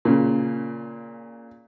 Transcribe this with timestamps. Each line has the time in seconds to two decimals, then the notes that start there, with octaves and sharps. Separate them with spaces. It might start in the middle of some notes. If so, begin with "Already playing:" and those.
0.05 A#2 C#3